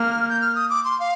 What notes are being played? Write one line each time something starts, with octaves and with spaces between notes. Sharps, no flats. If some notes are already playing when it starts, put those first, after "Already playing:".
Already playing: A#3 F6
G6
F6
D#6
D6
C6
F5